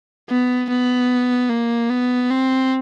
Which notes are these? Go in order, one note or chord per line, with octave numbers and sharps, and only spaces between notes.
B3
B3
A#3
B3
C4